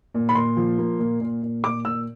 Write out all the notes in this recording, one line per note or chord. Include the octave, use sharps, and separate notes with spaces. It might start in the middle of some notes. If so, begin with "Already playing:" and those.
A#2
B5
A#2 C6
F3
A#3
A#2
A#2
A#2
A#2 D6
A#2 E6